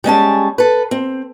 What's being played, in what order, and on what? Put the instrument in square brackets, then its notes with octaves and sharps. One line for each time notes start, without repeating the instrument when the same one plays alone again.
[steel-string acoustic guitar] G3 G#3 C#4 A5
A4 B4
C4